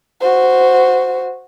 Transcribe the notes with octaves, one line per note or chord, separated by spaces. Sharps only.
F#4 C5